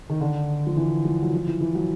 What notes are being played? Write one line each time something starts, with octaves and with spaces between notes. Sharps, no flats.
D#3
D3
F3
E3
F3
F#3
F3
E3
E3
F#3